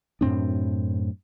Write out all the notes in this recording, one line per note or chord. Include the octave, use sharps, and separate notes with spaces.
F#2 A2 C4 D4